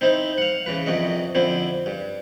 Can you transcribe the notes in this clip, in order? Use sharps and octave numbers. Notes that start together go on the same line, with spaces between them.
C4 D#4 E4 C5
F5 F#5
C#3 E3 B4
C2 F2 C3 F#4 D#5
F2 D3 C4 E4
G2